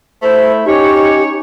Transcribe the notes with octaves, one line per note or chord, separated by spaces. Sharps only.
A3 E4 C5
C#4 D#4 G4 C#5